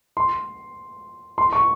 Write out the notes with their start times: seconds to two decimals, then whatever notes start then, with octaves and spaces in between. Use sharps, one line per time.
0.17 C6
1.38 C6
1.53 C#6